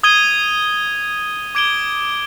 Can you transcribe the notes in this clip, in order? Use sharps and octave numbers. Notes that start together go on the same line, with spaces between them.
D#6 G#6 D#7 G7
D6 G#6 D7 G7